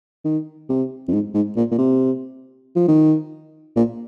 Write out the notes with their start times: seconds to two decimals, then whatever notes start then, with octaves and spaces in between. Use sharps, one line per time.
0.25 D#3
0.69 C3
1.08 F2
1.13 G#2
1.35 G#2
1.56 A#2
1.71 A#2
1.78 C3
2.76 F3
2.88 D#3
3.76 A#2